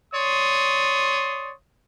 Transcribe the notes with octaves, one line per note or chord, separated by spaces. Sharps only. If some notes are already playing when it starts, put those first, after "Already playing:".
C#5 D5 C6 D#6